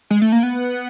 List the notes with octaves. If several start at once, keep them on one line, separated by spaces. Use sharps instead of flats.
G#3
A3
A#3
B3